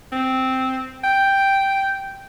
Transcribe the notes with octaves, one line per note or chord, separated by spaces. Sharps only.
C4
G5